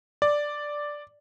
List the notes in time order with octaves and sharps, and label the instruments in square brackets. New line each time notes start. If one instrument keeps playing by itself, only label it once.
[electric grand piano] D5